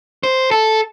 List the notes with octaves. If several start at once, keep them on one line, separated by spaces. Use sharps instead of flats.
C5
A4